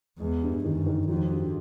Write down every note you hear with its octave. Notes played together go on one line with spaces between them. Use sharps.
E2 G#3
G2
F#2 D#3
D#3
F2 F#3
G2